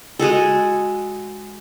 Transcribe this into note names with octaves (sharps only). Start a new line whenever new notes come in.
G#3 F#4 G#4 A4